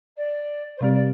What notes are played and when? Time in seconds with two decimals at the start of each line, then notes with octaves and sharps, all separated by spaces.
0.17 D5
0.77 C5
0.81 C3 G3 C4 G4 D5
0.92 D5